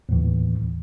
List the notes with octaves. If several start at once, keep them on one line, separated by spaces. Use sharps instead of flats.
D#2 A2 E3